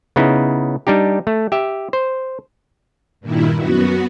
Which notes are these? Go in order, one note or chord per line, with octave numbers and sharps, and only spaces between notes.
C#3 B3 D#4 E4
G3 D4 D#4 G4
A3
G4 E5
C5
G2 A#2 D#3 E4
F#2 B3 F#4